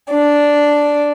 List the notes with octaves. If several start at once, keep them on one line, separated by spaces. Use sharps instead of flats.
D4